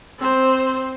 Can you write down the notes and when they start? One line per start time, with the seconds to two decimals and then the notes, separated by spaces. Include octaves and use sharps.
0.19 C4 C5